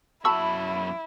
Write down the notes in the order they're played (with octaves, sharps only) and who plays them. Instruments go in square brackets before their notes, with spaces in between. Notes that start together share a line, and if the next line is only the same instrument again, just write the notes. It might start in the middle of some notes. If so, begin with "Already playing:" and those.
[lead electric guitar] F#2 B5 [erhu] E4 [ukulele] F#4 E5 A5 [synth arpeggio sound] C#6 E6